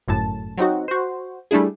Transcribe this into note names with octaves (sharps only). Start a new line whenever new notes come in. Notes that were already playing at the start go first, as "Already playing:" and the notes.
G1 F#2 A2 A5
F#3 C4 D#4 F#4
F#4 C5
G3 A3 D4 E4 G#4